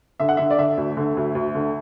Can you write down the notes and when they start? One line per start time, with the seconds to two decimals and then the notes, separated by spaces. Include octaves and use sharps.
0.20 D3 E5
0.29 F#5
0.37 D3 E5
0.50 D5
0.58 D3 E5
0.77 D2
0.97 D3
1.17 D2
1.35 D2
1.55 D3